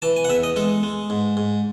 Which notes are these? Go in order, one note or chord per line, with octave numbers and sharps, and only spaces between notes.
E3 A5
G#5
F#5
E2 E5
D#5
G#3 A4
G#3
G#2
G#2